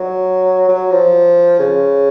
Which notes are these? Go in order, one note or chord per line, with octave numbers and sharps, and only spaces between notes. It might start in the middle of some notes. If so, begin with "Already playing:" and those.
Already playing: F#3
F#3
F3
C#3